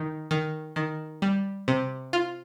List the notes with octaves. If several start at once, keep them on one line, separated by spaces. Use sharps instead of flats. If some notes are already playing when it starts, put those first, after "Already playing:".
Already playing: D#3
D#3
D#3
G3
C3
F4